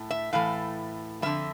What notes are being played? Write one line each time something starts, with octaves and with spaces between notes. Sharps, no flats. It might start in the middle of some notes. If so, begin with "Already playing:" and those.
Already playing: A2 A3
E5
A2 E3 A3 F5
F2 D3 G3 E5